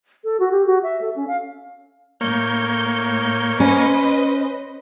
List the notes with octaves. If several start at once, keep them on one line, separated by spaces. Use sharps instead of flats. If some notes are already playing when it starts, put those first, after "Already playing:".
A4
F#4
G4
F#4
E5
A4
C#4
F5
A2 A#3 C#5 G6
C#4 B4 C5 D#5